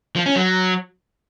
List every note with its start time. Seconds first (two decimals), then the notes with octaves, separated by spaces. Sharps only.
0.16 F3
0.26 C#4
0.36 F#3